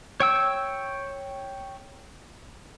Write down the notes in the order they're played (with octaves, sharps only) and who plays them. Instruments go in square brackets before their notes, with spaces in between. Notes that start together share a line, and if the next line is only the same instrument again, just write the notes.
[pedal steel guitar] C#5 G5 E6